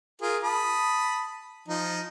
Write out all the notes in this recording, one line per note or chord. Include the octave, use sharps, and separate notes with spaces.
F4 G#4 A#4
A5 B5 D#6
F3 D#4